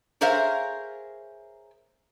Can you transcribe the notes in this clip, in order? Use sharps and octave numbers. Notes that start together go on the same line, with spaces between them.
G#4 A#4 C5 C#5 E5 F5